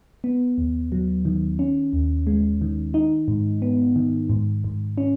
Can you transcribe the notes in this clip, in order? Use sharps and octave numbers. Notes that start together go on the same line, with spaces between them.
B3
D#2
F#3
D#3
C#4
D#2
G#3
D#3
D#4
G#2
B3
D#3
G#2
G#2
C#4